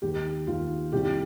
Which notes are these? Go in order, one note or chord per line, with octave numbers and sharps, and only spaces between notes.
D#2 G4
D#2 F4
C2 G4